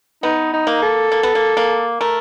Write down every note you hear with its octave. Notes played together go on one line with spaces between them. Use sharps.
B3 D#4
D#4
A#3
A4
A#3
B3
A#3
A#3
A3 A#4